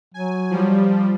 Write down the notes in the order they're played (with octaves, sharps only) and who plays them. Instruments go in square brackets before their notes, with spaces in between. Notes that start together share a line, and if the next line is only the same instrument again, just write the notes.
[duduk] F#3 [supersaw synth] G#5
[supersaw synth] F3 G3